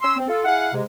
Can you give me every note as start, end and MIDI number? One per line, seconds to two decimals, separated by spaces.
0.02 0.15 61
0.02 0.15 84
0.02 0.15 88
0.17 0.25 60
0.29 0.44 65
0.29 0.44 69
0.45 0.69 64
0.45 0.69 68
0.45 0.69 77
0.45 0.69 78
0.73 0.82 44
0.73 0.82 48
0.73 0.82 56